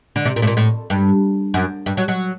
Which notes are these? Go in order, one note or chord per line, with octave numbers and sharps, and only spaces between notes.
D3
C3
A#2
A2
A#2
A2
G2
F#2
G2
F#3
F#3